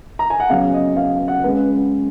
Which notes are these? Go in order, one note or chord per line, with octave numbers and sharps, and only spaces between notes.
A#5
G#5
F#5
C#3 F#3 B3 F5
D#5
F5
F#5
C#3 G#3 C#4 B4